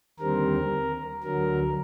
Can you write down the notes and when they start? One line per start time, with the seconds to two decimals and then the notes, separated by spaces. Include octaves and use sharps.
0.19 D#2 D3 G3 C4 A#4
1.23 D2 D3 F#3 A#4